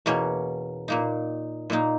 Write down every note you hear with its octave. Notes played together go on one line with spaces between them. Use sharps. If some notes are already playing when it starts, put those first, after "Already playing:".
E2 B2 A#3 C#4
A#2 A#3 D#4
A#2 A#3 D#4